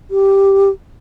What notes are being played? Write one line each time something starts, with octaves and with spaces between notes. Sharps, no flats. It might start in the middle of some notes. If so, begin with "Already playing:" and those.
G4